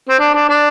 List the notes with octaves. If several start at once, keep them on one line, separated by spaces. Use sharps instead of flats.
C4
D4
D4
D4